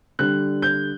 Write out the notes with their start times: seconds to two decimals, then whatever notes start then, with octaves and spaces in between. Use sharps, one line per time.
0.19 D3 G3 F#6
0.62 G6